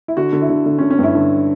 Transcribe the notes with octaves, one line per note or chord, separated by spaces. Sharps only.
E4
D3 F#4
D3
E4
D3
D3
C#4
D3
C#4
G2 E4
D3